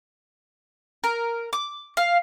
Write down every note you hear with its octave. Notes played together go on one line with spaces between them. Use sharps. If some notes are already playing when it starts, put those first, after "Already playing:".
A#4
D6
F5